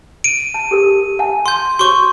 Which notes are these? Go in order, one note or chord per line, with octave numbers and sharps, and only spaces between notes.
D7 D#7
A5
G4 A4 A#4
F#5 G#5 A5
C6 G6
F#4 C#5 C6 C#6